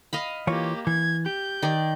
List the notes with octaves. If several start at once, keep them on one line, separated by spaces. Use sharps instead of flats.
D#5 F5 B5
E3 A#3 F4 G4 C#5
E3 G#6
G4 G6
D#3 D5